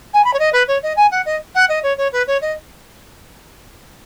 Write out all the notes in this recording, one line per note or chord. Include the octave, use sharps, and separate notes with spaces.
G#5
B5
C#5
D#5
B4
C#5
D#5
G#5
F#5
D#5
F#5
D#5
C#5
C#5
B4
C#5
D#5